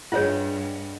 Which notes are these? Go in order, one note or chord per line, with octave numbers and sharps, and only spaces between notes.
G2 F4 G#4 C#5 D#5 F#5